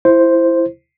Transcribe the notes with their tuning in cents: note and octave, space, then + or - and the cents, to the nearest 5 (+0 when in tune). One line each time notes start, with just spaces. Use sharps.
E4 +15 C5 +0